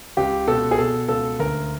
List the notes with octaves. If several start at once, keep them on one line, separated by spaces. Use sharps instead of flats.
C#2 G4
B2 A4
G#4
B2 A4
C#2 A4
D2 A#4